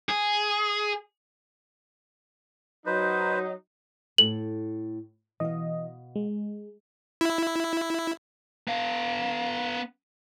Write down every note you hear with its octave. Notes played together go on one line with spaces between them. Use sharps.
G#4
F#3 D#4 B4 C5
A2 A4 F#7
B2 E3 D#5 F5
G#3
E4
B3 F5